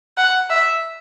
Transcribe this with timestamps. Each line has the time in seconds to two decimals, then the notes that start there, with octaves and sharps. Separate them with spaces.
0.17 F#5
0.50 E5